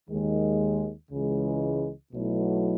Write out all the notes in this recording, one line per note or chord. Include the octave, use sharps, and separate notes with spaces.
D#2 D#3 G#3
C#2 C#3 E3 G#3
B1 B2 F#3 A3 E4